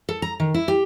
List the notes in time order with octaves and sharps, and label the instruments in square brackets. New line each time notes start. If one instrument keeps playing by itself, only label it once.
[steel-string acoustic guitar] A4
A#5
D#3
E4
G4